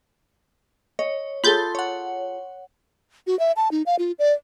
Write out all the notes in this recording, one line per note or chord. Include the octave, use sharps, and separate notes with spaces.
C#5 D#5
F4 G#4 A4 B5 C6 G6 A6
C#5 F#5
F#4
E5
A5
D#4
F5
F4
D5